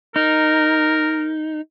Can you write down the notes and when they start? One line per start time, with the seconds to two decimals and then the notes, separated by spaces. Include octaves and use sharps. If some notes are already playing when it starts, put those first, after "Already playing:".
0.16 D#4 A#4